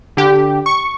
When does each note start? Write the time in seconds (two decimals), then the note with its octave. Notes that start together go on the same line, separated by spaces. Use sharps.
0.17 D3 G4
0.66 C#6